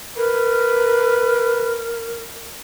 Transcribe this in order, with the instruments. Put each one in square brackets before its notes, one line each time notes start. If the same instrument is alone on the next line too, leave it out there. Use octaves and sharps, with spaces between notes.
[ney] A#4 [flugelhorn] B4